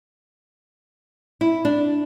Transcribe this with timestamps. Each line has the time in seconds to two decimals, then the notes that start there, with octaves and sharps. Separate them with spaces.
1.41 E4
1.65 D4